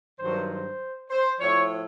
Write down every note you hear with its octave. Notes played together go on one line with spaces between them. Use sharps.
G2 D#3 F#3 C5
C5
C5
A2 F3 C#5